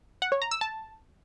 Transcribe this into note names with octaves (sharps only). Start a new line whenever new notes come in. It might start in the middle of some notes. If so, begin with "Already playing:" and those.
F#5
C#5
A#5
E6
A5